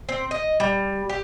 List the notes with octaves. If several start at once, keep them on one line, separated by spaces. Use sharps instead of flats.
C4
D#5
G3
G4